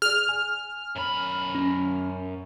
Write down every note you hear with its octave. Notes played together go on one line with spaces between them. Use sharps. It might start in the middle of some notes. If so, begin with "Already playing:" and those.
G#4 D5 F6
G#5
F#2 B5
C#4